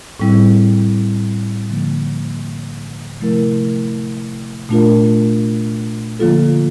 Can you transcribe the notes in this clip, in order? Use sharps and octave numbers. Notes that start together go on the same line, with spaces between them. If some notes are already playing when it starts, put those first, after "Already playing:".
A2 G3 C4 E4
D3 F3 A#3
C3 F3 A3 E4 A#4
A#2 A3 D4 F4 A#4
D3 F3 A#3 F4 A4